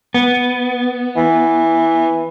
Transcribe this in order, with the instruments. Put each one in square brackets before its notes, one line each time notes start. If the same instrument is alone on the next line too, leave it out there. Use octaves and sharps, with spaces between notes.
[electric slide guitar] B3
[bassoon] E3